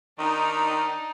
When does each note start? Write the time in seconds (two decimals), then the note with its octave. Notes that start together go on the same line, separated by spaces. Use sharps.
0.18 D#3 D4 D#4